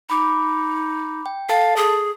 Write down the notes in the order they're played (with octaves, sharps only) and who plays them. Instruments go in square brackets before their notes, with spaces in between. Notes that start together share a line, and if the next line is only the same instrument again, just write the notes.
[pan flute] D#4 [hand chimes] B5 D6
[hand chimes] G5
[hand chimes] A4 A5 A6 [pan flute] F5
[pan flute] G#4